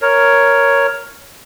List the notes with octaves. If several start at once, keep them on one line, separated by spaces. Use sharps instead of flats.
A#4 C#5